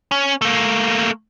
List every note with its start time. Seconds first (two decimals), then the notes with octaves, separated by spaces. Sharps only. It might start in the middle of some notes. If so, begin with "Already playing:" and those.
0.11 C#4
0.41 A3 A#3